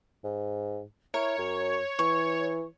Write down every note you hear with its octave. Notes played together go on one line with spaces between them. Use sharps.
G#2
E4 A#4 C#5
F#2
E3 C#6